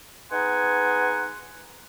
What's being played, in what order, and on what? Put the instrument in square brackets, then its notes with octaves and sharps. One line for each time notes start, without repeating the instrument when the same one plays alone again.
[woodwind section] B3 D#4 G#4 F#5 G#5 C6